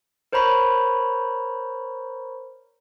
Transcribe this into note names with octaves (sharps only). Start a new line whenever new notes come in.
A#4 C5 C#5 A#5 B5 C#6